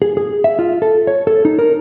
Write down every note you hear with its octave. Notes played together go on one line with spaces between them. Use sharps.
G#4
G#4
E5
F4
A4
C#5
A4
D#4
A#4